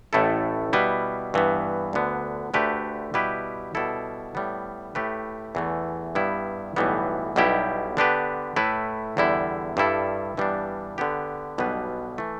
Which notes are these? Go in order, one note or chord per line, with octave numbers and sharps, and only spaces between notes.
A1 A2 A3 E4 A4
B2 G3 E4 B4
G2 E3 B3
D2 D3 B3
D2 D3 A3 G4 B4
B2 G3 E4 G4 B4
B2 G3 E4 A4
A2 G3 B3
A2 A3 G4 B4
E2 E3 A3
G2 G3 B3 E4
B1 A2 E3 G3 B3
B1 B2 G3 E4 G4
D3 B3 D4 G4 B4
A2 A3 E4 B4
E2 D3 G3 E4
G2 G3 E4 A4
G2 E3 G3 B3 D4
D3 B3 G4
B1 B2 G3 D4 B4
E3 A3